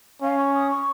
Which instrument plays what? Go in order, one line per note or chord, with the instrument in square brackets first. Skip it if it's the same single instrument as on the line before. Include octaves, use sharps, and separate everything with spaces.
[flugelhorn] C#4 [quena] F5
[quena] C#6
D#6
C#6